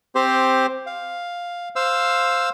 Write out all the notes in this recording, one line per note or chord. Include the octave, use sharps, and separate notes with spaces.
C4 G4 C5
F5
C5 F5 E6